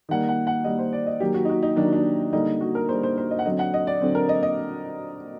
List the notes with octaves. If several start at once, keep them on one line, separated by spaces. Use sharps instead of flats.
D#3 G3 A#3 F#5
F#5
F#5
D#3 G3 A#3 D#5
C5
D5
D#5
D#3 F#3 A#3 G4
F#4
D#4
F#4
D#4
D#3 F#3 A#3 D4
D4
D3 G3 A#3 D#4
F#4
A#4
D3 G3 A#3 C5
C5
C5
D#5
F#5
D3 F#3 C4 D#5
F#5
D#5
D5
D3 F#3 C4
A#4
D#5
D#5